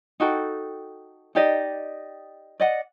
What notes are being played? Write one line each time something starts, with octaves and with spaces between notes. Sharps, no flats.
D#4 F#4 A4 G5
D#4 G4 D5 D#5
D5 D#5 F#5